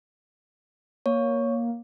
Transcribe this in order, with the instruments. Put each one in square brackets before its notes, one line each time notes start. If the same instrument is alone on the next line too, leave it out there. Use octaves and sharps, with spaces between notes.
[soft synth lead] A#3 [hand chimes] C#5